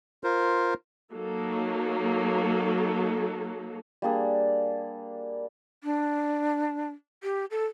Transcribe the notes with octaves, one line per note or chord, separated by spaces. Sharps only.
F4 A#4 C5
F#3 A#3 D#4 A4
G3 A#3 D4 G#4
D4
G4
A4